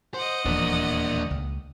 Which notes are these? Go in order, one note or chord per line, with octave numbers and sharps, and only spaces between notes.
C5 D#5 F#5
D#1 E2 F3 A#3 D4
C#2